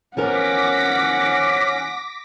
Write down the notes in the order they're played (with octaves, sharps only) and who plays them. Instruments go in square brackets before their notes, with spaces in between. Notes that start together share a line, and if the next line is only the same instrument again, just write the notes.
[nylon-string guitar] F3 B3 A#4 [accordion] C#4 [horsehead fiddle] F#5 [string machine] D6 A#6 B6